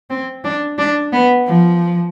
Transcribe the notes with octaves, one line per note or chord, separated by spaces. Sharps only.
C4
D4
D4
B3
F3